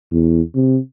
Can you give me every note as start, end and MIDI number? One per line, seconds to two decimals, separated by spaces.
0.12 0.41 40
0.55 0.78 48